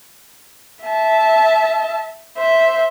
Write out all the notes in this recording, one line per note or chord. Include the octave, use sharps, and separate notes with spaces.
E5 A5
C5 E5